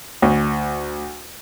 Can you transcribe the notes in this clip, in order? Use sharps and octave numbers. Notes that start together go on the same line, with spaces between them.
D2